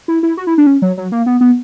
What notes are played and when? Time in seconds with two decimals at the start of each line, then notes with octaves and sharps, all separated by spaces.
0.08 E4
0.23 E4
0.37 F#4
0.47 E4
0.58 D4
0.67 C#4
0.82 F#3
0.97 F#3
1.12 A#3
1.26 B3
1.41 B3